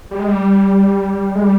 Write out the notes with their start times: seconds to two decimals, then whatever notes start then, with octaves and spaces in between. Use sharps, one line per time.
0.11 G3
0.19 G#3
0.28 G3
1.35 G#3
1.41 G3